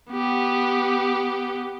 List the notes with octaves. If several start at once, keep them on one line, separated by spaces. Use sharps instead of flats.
B3 G4